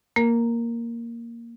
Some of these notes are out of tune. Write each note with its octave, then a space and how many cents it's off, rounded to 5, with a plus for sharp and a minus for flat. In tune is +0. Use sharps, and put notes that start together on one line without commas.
A#3 +0 A#4 +0